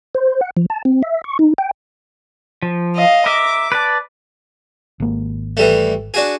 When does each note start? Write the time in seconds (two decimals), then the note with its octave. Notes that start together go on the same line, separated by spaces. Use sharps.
0.15 C5
0.41 F#5
0.57 F3
0.70 A5
0.85 C4
1.03 E5
1.24 C#6
1.39 D#4
1.58 G5
2.63 F3
2.95 D#5 F5
3.26 A#4 E5 D6
3.72 B4 D5 A5
5.00 G#1 A#3
5.57 E3 G3 A3
6.14 D4 F#4 G#4